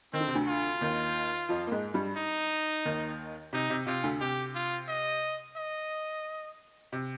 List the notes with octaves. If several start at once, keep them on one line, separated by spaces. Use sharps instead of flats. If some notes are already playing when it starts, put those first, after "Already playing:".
D#3 C4
D3
C3
D2 D3
F4
D#2 D#3
F2 F3
A#3
G#2 G#3
G2 G3
D#4
D#2 D#3
C3 D#4
C3
C3 F4
D2 D3
C3 G4
F4
D#5
D#5
C3